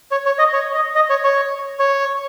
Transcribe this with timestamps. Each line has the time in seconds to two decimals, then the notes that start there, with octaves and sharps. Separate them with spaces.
0.11 C#5
0.26 C#5
0.39 D#5
0.53 C#5
0.74 D#5
0.95 D#5
1.10 C#5
1.24 C#5
1.79 C#5